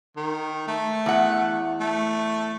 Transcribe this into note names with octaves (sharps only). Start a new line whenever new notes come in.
D#3
A3
E2 F#5
A3